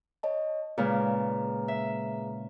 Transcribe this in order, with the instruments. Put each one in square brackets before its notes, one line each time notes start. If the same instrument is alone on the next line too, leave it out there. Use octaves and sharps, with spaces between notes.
[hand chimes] C#5 D#5 A5
[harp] A#2 C#3 G#3 [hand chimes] G#4 B4 A#5
[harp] E5